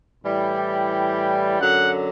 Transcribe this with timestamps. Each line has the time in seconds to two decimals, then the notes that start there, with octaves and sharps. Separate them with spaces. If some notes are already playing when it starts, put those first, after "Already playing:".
0.25 A2 E3 G3
0.58 G5
1.60 F#2 D3 F#3 F#5